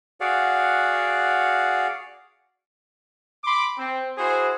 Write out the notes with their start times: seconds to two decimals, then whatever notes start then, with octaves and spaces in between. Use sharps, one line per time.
0.21 F#4 G#4 D5 F5 F#5
3.44 B5 C6 D6
3.78 C4
4.17 E4 F#4 G#4 C5